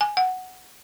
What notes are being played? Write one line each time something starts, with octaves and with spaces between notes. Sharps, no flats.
G#5
F#5